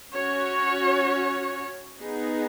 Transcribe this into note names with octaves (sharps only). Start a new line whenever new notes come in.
C#4 F#4 C#5
B3 D#4 G#4